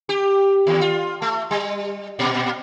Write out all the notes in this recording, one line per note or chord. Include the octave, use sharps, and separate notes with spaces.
G4
D#2
F4
A3
G3
A#2